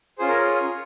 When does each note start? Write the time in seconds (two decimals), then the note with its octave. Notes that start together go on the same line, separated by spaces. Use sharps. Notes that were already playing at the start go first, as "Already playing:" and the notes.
0.18 C#4 F4 G#4 C5
0.28 A#4